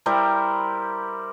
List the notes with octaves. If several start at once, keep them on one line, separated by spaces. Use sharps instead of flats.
G3 E4 A#4 C5